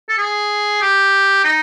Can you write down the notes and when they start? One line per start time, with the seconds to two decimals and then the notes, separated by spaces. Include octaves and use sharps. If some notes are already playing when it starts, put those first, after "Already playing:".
0.09 A4
0.18 G#4
0.81 G4
1.44 D#4